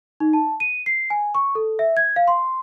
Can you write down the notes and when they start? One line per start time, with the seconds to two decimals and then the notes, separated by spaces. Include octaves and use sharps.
0.20 D#4
0.33 A5
0.60 D#7
0.86 C7
1.10 G#5
1.35 C#6
1.55 A4
1.79 E5
1.97 G#6
2.16 F5
2.28 C6